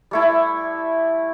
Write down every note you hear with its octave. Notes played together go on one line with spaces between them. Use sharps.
G3 A3 E4